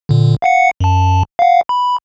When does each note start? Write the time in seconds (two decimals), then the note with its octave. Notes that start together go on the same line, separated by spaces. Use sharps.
0.09 A#2 D3
0.42 F5 F#5 C#7
0.80 F#2 A5
1.39 F5 F#5
1.69 B5